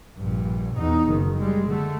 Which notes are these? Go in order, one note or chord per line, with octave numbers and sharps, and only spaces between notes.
A#1 G2
E2 D#4
F#1 D#3
G3 G#3
D3 A3